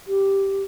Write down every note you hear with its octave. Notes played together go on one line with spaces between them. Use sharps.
G4